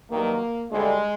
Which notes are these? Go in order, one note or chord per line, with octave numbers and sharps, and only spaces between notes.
G2 D#3 F#3 A#3
D2 D3 G3 G#3